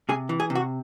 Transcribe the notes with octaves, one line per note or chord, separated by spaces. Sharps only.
C3 G#4
E3
G#4
C3
F#4